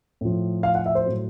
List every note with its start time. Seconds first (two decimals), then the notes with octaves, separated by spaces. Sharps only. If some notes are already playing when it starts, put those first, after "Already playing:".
0.21 A2 F3
0.63 F5
0.75 F#5
0.86 E5
0.95 C5
1.06 A2 F#3